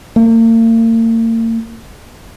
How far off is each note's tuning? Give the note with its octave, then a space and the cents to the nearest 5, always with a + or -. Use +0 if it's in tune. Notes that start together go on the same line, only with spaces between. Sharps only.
A#3 -45